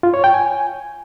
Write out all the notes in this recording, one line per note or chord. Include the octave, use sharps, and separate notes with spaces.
F4
C#5
G5
G#5